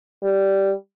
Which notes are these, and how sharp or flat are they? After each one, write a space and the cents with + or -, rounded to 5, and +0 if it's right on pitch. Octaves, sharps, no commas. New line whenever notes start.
G3 -5